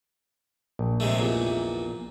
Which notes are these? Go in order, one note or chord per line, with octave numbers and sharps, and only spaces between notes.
A#1
C3 G#3 A3
E2 A#2